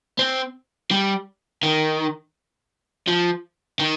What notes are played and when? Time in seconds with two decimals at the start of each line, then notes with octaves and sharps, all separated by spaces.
0.19 C4
0.91 G3
1.63 D#3
3.07 F3
3.79 D#3